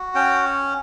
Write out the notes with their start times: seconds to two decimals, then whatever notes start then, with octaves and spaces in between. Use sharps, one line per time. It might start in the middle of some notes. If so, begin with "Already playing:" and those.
Already playing: F#4
0.15 C#4 G5